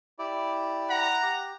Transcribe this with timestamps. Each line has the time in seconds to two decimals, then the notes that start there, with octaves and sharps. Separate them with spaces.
0.19 E4 G4 D5
0.90 F#5 A#5
1.23 G4